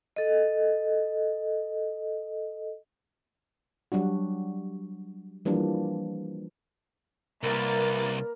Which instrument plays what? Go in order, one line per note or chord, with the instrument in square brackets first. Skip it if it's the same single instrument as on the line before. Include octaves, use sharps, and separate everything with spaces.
[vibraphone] A4 D#5
[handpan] F#3 G3 D4 F#4
E3 F3 G3 A#3 D4
[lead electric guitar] C2 [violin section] A#3 B4 A6 [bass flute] A#4